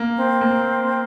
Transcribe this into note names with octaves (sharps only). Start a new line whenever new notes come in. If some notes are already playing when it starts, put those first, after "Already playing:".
Already playing: A#3
C4
A#3